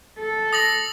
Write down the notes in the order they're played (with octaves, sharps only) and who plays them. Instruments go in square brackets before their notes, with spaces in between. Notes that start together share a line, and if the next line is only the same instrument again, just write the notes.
[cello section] A4
[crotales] D#6 A#6 F#7